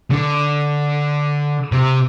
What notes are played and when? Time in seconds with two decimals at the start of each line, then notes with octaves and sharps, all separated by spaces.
0.10 D3
1.72 C3